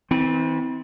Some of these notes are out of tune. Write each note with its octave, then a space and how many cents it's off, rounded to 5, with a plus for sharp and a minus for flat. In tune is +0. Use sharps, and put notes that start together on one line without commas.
E3 -40 C4 -15